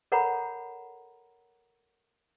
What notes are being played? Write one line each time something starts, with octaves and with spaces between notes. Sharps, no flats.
A4 A#4 C#5 F#5 A#5 B5